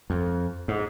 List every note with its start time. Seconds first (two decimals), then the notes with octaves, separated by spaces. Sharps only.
0.10 F2
0.68 G#2